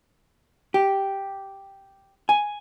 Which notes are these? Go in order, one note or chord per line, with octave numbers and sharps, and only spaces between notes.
G4
G#5